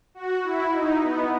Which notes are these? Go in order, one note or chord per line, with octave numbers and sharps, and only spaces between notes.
F#4
E4
D#4
B3